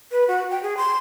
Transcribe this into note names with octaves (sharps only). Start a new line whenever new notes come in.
B4
F#4
G5
G#4
C6